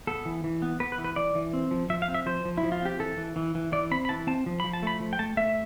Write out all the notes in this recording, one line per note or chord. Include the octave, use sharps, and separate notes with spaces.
B3 A4
E3
E3
B3
B3 B4
B4
E3
B4
E3 D5
E3
C4
F3
F3 E5
F5
C4
E5
F3 C5
F3
E4
F3
F4
C4 G4
E3 A4
E3
E3
E3
E3 D5
C4 B5
B5
E3 A5
C4 A5
F3
F3 B5
A5
A3 B5
F3
G5
A3 A5
A3 E5